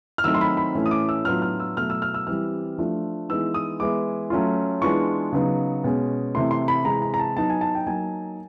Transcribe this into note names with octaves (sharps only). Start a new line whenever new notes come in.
F6
D#3 F#3 A3 C4 D#4 E6
C6
B5
B5
A2 E3 A3 C#4
D#6
D6
E6
A2 F#3 B3 D4 F4 F6
F6
E6
B2 F#3 A3 F6
E6
F6
E6
E3 G3 C4 F6
F3 A3 D4 F4
E3 G#3 B3 D#4 E6
D#6
E3 G#3 B3 E4 D6
F#3 A3 C#4 F4
E3 G#3 B3 D4 F4 C#6
C#3 F#3 B3 D#4
B2 G#3 C#4
C3 E3 A3 C6
C6
B5
C3 E3 G#3 A#5
A#5
A#5
A5
F#3 B3 D#4 A5
G#5
A5
G5
F#3 A#3 D#4 G#5